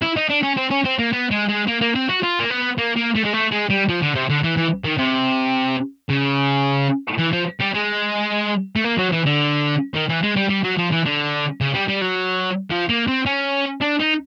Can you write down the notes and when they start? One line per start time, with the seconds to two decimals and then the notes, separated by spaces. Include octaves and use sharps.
0.02 E4
0.16 D#4
0.30 D4
0.43 C#4
0.57 C4
0.71 C#4
0.85 C4
0.99 A#3
1.13 B3
1.31 G#3
1.49 G#3
1.68 A#3
1.81 A#3
1.95 C4
2.09 F#4
2.23 F4
2.40 A#3
2.50 B3
2.78 A#3
2.96 A#3
3.15 A3
3.24 G#3
3.33 A3
3.51 G#3
3.70 G3
3.89 F3
4.02 D3
4.15 C3
4.29 D3
4.43 E3
4.57 E3
4.85 D#3
4.98 C3
6.09 C#3
7.19 E3
7.33 F3
7.61 G3
7.75 G#3
8.76 A3
8.84 A#3
8.98 F#3
9.12 E3
9.26 D3
9.94 D#3
10.09 E3
10.23 G#3
10.36 G3
10.49 G3
10.63 F#3
10.77 F3
10.91 E3
11.05 D3
11.61 C#3
11.74 G3
11.88 G3
12.02 F#3
12.71 F3
12.89 A#3
13.08 C4
13.26 C#4
13.81 D4
13.99 D#4